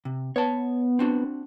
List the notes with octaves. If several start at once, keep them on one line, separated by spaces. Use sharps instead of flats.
C3
B3 C#5 A5
C4 D4 F#4